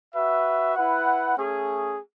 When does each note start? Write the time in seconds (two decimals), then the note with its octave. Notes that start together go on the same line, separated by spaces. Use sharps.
0.15 F#4 B4 E5
0.76 E4 B4 F#5
1.38 A3 C#4 G#4